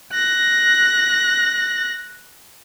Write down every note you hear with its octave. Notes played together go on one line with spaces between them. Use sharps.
F#6 A#6